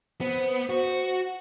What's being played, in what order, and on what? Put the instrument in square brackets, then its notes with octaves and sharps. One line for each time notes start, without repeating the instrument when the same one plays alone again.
[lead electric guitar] B3 [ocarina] C5
[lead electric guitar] F#4